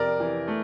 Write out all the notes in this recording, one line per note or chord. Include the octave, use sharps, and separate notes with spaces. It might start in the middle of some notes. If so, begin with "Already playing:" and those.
Already playing: F2 C3 A#4 D5
E3
A3